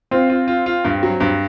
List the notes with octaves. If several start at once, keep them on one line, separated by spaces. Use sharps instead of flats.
C4 F4
F4
F4
F4
G2
F#3
G2